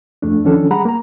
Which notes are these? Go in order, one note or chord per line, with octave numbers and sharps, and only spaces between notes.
F2 A3 D4
D#3 F3 C#4 D4 A4
G3 G#4 F#5 A#5 B5
A#3 A#5